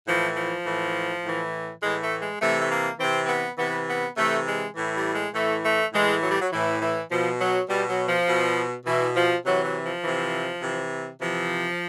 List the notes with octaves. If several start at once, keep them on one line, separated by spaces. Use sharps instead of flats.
A2 E3 F3
F3
A2 E3
A2 E3
A2 E3 G#3
A3
G#3
C3 E3 A3
A3
A#3
C3 E3 C4
C4
B3
C3 E3 B3
B3
C3 E3 A3
G#3
A2 E3
G3
G#3
A2 E3 A3
A3
A2 E3 G#3
F#3
G3
F#3
A2 E3
E3
B2 F3
F#3
B2 G3
F#3
F3
B2
B2 E3
F3
C3 E3 F#3
F#3
F3
C3 E3
C3 E3
C3 E3 F3